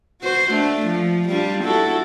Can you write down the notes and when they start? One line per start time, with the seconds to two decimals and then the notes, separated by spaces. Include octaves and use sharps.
0.22 F#4 C5
0.52 A3 D4
0.86 F3
1.28 G3 D4 F4
1.64 E4 F#4 A4